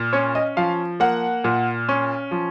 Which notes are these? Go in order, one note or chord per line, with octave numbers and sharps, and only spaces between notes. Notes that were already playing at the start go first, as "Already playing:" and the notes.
Already playing: A#2
C#4 C#5
D#5
F3 F5
A#3 F#5
A#2
C#4
F3